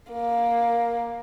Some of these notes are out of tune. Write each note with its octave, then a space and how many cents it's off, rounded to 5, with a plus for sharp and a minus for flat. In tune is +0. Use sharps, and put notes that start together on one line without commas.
A#3 +10